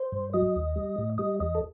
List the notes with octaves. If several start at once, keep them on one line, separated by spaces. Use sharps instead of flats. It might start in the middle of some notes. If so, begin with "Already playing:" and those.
Already playing: C5
G2
F#3 D#5
D#2
G3
A2
G3 D#5
E2 D#5
A4